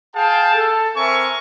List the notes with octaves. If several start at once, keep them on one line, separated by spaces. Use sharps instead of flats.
G#4 F5 G5 A5
A4
C4 A#4 E5 G#5 C#6